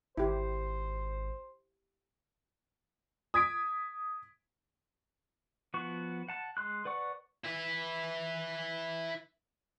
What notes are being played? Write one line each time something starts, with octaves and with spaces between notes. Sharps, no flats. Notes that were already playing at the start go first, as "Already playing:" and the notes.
G#1 E4 G4 C5
D#6 G#6 B6 D7
F3 B3 F#4 C#6
F#5 A5
G#3 C6 F#6
B4 D5 F#5 C#6
E4 B4